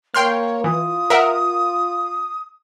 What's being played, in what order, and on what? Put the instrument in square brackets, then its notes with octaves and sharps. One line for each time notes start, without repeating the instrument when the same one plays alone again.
[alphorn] A#3 [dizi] C#5 [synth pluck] G5 C6 F6
[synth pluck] E3 [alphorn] F4 [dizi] D#6
[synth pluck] A#4 E5 F#5